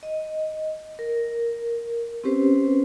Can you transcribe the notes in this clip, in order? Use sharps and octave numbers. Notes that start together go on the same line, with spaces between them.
D#5
A#4
C4 C#4 G4 B4 C5